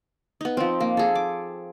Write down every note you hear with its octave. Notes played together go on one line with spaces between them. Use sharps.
B3 D#4
F3 C4
A#3
G#4 A4
D6